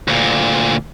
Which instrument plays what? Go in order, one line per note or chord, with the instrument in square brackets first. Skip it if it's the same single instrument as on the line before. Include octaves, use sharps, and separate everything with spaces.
[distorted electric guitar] D2 A#2